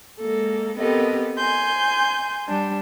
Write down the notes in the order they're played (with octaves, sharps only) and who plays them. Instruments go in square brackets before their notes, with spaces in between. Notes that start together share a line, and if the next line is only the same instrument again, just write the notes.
[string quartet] G#3 A#3 A4
B3 C4 G4 A4 A#4 D#5
G#5 C6 G6
G3 D4